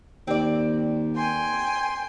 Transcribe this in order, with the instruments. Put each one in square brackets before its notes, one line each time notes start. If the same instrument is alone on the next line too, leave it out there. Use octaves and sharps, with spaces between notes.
[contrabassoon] D#2 [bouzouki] C4 D5
[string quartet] G5 G#5 [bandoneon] C6